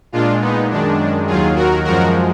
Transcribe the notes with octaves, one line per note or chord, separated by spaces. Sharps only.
A#2 G#3 D4 F4
B3 D#4
F#2 D#3 G#3 D4
D#2 D#3 F#3 F4 G#4
F#4 A#4
F#2 F3 G#3 F#4 A#4